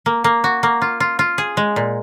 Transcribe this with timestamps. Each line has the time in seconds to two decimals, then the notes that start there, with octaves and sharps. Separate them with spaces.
0.06 A#3
0.24 A#3
0.44 F#4
0.63 A#3
0.82 F4
1.00 F4
1.19 F4
1.38 G#4
1.57 G#3
1.76 A#2